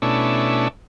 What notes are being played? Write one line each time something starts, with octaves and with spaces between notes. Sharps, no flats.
B2 A3 C#4 D4 E4